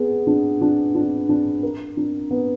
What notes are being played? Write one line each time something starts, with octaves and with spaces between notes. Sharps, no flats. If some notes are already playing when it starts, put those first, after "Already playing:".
Already playing: B3 G#4
D4
D4
D4
D4
A#4
D4
B3